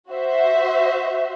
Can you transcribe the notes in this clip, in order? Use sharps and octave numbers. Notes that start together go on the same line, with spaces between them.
F#4 C5 E5